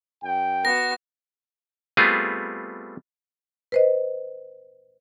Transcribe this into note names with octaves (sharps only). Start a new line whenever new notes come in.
F#2 G5
B3 F#4 A#6
G3 A3 B3 C4 F4 G#4
B4 C5 D#5